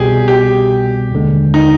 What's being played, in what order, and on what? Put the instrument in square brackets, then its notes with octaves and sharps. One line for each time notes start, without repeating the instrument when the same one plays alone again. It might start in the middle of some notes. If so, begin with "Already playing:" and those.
Already playing: [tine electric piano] C2 B2 G3 [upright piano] G4 G#4
[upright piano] G4
[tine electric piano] D#2 D3 G#3
[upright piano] D#4